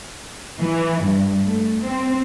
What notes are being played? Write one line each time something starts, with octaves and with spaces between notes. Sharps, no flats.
E3
G2
A3
C4